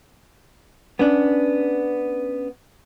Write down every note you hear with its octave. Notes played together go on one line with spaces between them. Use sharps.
B3 C#4 D4